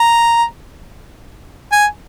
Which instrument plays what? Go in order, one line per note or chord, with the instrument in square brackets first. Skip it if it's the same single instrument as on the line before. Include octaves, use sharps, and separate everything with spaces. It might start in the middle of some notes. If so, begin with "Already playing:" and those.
Already playing: [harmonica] A#5
G#5